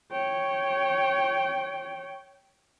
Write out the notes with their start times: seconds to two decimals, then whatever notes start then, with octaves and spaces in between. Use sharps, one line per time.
0.12 C#5 G5